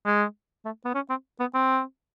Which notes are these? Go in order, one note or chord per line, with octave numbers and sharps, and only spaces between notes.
G#3
A3
B3
C#4
C4
B3
C4